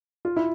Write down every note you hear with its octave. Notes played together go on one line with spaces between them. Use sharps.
F4
E4